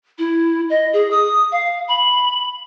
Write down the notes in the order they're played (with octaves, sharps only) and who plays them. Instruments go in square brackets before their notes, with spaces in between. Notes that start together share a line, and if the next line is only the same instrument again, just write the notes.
[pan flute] E4
D#5
G#4
D#6
F5
B5